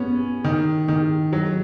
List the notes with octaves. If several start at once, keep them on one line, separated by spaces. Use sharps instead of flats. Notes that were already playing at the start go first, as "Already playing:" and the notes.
Already playing: B3 C#4
D#3
D#3
F#3